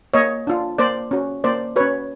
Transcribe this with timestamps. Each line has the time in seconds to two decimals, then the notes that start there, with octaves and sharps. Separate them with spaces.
0.14 A#3 C#5 D#5
0.47 D4 F4
0.79 A#3 C5 D5
1.11 C#4 F#4
1.44 A#3 C5 D5
1.76 C#4 F#4 B4 C#5